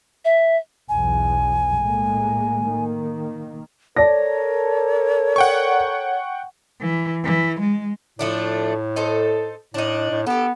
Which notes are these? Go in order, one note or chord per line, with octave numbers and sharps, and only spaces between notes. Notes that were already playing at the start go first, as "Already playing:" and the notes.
E5
B1 E2 G#5
A2 G#3 A#3
D#3 A#3
A4 A#4 C#5 D5 A5 A#6
F#5 G5 C#6
E3
E3
G#3
A2 F3 A3 D4
D#4 A4 C5
A2 D4 D#4
A2
B3 G4 A4